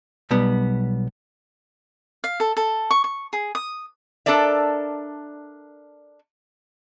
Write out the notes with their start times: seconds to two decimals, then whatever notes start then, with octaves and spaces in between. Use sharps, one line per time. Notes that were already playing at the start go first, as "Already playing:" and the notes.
0.31 B1 G3 B3
2.24 F5
2.40 A4
2.57 A4
2.91 C#6
3.04 C#6
3.33 G#4
3.55 D#6
4.26 D4 A4 A#4 D5 E5